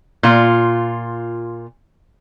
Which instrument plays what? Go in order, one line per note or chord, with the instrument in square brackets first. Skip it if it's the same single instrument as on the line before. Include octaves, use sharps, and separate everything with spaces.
[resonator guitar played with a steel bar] A#2 F4